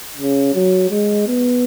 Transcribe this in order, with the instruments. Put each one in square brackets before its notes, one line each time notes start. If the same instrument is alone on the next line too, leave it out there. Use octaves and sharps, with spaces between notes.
[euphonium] C#3
F#3
G#3
B3